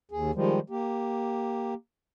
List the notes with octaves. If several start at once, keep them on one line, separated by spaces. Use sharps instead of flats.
D#2 G#4
D#3 F3 G3 G#3
A#3 G4